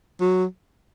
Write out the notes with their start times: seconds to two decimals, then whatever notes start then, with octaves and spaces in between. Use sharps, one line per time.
0.21 F#3